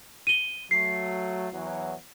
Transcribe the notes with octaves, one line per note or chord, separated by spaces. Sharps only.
D#7 G7
F#3 A3 C7
E2 E3 F#3